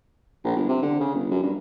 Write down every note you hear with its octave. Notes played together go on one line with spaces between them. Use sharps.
A#1
G1
C3
D3
C#3
G1
F#2
G2